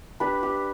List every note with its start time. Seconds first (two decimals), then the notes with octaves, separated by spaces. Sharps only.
0.20 D4 G4 B4
0.43 G4